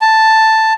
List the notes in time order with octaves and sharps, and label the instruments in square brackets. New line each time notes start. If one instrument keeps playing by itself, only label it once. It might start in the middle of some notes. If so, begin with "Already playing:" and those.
[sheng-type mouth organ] A5